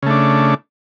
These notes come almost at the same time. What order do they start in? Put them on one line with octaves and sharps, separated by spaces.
C#3 A3 D4